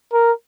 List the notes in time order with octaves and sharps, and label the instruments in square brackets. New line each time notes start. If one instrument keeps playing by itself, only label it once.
[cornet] A#4